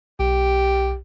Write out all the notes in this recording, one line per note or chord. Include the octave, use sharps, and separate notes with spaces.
B1 G4